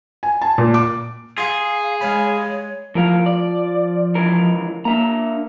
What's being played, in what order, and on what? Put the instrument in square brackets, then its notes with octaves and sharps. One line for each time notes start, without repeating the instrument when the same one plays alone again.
[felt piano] G#5
A5
A#2
D6
[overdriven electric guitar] G#4 [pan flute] F5 [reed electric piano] C6
[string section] G#3 [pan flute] C#5 [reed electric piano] F5 B5
[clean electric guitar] A2 A#4 F5 [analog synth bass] F3
[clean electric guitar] D5
C#2 E3 A#4
[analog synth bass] A#3 [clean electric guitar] D4 E5 A#5